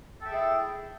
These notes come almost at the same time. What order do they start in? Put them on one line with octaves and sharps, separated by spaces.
A4 G5 E5 G#4 E4